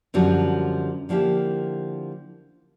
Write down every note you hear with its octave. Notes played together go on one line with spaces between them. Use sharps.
F#2 D3 F3 G3 F#4
D3 F3 A#3 E4 G4